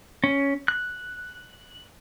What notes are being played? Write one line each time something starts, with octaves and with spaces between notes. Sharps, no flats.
C#4
F#6